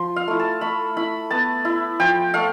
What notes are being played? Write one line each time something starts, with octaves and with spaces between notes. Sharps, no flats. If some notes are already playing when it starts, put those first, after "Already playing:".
Already playing: F3 C6
F5
A3 E4
A5
A3 B5
E4 B5
B3 A5
E4
F3 G5
A3 F5